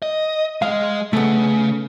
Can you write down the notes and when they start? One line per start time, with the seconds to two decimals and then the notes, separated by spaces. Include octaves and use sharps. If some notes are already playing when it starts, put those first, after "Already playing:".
0.02 D#5
0.62 G#3 D#5 F5
1.13 C#3 A3 B3